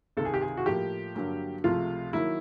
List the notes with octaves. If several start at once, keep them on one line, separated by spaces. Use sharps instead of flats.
C#2 C3 D#3 A4
G#4
G4
G#4
F#4
A2 F3 A#3 G4
G2 D3 F#3 A#3
C#2 C3 F3 A3 F4
D#3 F#3 A#3 E4